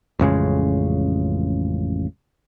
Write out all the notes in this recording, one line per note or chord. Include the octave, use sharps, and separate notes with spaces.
A1 F2 C#3 G#3